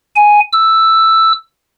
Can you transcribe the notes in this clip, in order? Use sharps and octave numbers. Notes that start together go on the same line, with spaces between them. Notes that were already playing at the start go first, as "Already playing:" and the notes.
G#5
E6